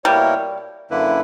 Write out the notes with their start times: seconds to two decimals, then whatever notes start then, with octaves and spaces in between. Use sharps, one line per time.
0.04 B2 G3 A#3 E4 A#4 C#5
0.90 F#2 D3 A#3 E4 B4